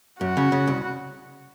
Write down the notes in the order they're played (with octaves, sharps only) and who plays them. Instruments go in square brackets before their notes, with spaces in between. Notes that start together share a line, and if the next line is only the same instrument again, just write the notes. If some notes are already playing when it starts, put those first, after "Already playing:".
[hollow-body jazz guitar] F#2 [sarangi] F#4
[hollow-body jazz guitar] C#3
C#3
C2